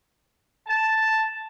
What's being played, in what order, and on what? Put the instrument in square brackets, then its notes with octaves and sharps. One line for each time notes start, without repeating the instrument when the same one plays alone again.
[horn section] A5